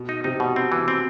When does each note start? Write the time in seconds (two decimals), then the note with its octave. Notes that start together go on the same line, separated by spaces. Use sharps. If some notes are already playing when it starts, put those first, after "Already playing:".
Already playing: B2
0.09 D#4
0.24 C3 D#4
0.40 B2
0.56 C4
0.72 E3
0.88 C4